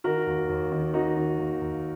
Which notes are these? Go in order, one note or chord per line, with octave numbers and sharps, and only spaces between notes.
D#3 F#4 A#4
D#2
D#2
D#3
D#3 D#4 F#4
D#3
D#2
D#2